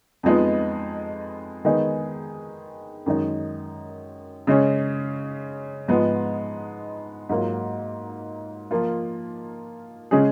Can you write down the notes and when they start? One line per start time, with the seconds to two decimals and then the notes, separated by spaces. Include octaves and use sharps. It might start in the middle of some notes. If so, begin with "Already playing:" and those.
0.23 F2 F3 G#3 B3 D#4
1.65 D#3 G#3 B3 D#4 G#4
3.06 F#2 D#3 G#3 D#4
4.47 C#3 G#3 C#4
5.88 G#2 F3 G#3 B3
7.29 G#2 F#3 A#3 F4
8.71 F3 A#3 F4
10.11 C#3 G#3 C#4 G#4